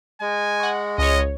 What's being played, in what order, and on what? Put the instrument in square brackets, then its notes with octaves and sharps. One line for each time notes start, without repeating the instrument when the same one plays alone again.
[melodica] G#3 [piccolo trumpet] G#5
[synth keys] F#5 C#6
[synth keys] C#2 C#5 [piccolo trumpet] D#5